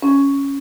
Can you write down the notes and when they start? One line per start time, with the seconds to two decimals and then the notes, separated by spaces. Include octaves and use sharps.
0.02 C#4